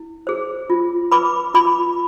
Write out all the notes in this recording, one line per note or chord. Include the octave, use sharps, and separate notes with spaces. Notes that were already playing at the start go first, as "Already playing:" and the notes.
Already playing: E4
G#4 C5
F4
B4 B5 D6
F4 B5 D6